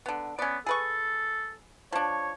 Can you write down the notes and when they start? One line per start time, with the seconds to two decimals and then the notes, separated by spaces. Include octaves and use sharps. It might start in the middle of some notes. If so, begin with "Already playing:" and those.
0.06 D3 B3
0.39 B3 C#4 D5
0.66 G#4 A4 B4 C#6
1.92 F3 D4 C#5